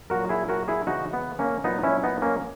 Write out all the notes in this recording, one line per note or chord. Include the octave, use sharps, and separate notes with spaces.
A#2 F#3 F#4 A#4
E4 G#4
F#4 A#4
E4 G#4
C#3 E3 D#4 F#4
B3
A#3 C#4
A#2 F#3 B3 D#4
C#4 E4
B3 D#4
A#3 C#4